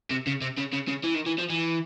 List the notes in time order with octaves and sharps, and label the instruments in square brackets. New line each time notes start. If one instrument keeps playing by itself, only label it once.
[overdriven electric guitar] C3
C#3
C3
C#3
C#3
C#3
E3
D#3
E3
F3
E3